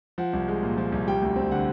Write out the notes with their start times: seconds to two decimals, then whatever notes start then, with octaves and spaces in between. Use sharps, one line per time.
0.18 F3 F#5
0.33 C2
0.48 G#3
0.63 A#2
0.77 F3
0.92 C2
1.07 G3 G5
1.22 D2
1.36 C4
1.52 D3 F#5